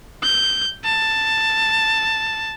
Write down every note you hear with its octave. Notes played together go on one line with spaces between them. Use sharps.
G6
A5